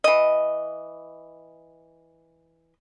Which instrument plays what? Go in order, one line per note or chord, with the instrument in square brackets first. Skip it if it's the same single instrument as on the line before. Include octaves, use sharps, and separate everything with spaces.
[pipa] E3 D#5